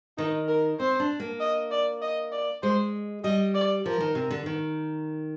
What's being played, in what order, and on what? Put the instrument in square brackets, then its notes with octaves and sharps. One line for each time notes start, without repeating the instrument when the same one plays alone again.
[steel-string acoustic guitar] D#3 [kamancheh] D#4
[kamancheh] A#4
[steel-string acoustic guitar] C4 [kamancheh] C5
[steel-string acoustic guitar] D4
A#3
[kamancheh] D#5
D5
D#5
D5
[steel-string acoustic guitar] G#3 [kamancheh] C5
[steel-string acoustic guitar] G3 [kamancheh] D#5
[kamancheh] D5
[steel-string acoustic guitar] F3 [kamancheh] A#4
[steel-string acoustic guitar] D#3
C3
D3
D#3